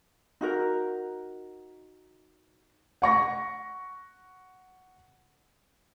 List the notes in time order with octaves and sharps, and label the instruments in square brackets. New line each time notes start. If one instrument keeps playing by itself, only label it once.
[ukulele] D#4 F#4 A#4
[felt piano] F#5 C#6 A#6